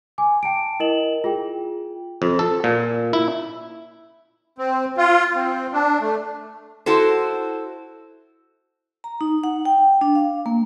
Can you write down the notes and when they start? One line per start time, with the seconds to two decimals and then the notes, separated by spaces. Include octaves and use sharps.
0.18 G#5 D6
0.43 G5 A5 D7
0.80 E4 A#4 D#5 E7 F#7
1.24 F4 G#4 G5
2.22 F2
2.39 A4
2.64 A#2
3.13 E4
4.58 C4
4.98 F4
5.36 C4
5.73 D4
6.01 A3
6.86 E4 F#4 A4 C5
9.04 A#5
9.21 D#4
9.44 F#5
9.65 G5
10.01 D4
10.15 F5
10.46 A#3